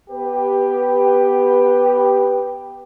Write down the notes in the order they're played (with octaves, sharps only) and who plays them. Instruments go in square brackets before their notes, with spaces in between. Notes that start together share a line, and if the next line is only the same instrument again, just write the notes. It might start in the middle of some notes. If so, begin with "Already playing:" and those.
[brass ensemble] B3 G4 B4